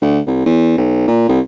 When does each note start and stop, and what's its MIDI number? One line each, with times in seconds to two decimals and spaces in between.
0.01 0.19 38
0.27 0.42 36
0.46 0.74 40
0.77 1.06 35
1.07 1.25 46
1.29 1.40 36